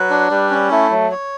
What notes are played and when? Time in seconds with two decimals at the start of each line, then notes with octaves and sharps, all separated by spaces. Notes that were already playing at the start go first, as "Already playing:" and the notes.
Already playing: F#3 B4
0.10 D4
0.31 G3 B4
0.50 C#4
0.70 A3 E4
0.91 F#3
1.11 C#5